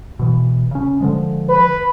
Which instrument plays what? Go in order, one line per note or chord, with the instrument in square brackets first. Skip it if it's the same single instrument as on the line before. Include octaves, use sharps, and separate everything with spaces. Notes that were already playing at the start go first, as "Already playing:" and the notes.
[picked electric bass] B2 E3
C#3 C#4
D3 F3 G#3
[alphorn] B4